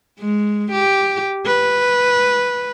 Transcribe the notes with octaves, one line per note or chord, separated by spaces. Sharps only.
G#3
G4
B4